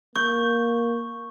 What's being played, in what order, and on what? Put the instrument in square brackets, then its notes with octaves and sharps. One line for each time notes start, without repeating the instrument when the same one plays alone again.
[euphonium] A#3 [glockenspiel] C#6 [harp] G6